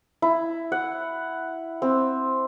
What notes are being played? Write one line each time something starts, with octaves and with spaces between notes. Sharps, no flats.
E4
F#5
C4